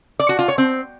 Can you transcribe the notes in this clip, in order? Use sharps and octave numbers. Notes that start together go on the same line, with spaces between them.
D5
F#4
F4
C#5
C4